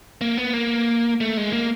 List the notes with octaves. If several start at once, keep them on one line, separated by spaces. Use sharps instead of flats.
A#3
B3
A#3
A3
G#3
A#3